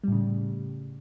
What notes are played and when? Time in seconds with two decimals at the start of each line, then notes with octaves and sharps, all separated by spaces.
0.04 G3
0.08 A2
0.12 C#3